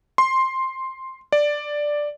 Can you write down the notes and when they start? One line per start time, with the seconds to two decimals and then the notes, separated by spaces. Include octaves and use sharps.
0.18 C6
1.32 D5